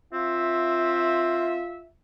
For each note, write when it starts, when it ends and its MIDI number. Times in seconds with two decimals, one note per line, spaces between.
0.13 1.60 60
0.13 1.88 65
0.13 1.88 76